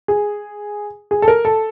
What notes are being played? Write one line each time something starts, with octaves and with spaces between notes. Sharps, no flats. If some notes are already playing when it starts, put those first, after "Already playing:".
G#4
G#4
A4
A#4
A4